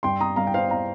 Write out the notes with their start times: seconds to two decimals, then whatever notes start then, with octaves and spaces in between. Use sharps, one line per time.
0.03 G2 G5 C6
0.20 A#5 D#6
0.36 G2 F5 A#5
0.47 G5
0.54 C5 F5
0.70 F5 A#5